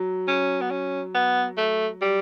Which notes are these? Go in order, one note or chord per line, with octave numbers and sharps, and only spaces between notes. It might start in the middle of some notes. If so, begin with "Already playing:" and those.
Already playing: F#3
C#4
B3
C#4
B3
A3
G3